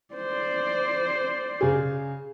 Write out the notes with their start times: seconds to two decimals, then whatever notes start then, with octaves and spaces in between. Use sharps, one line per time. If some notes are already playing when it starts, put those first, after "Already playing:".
0.15 C5 D5
1.61 C#3 G#4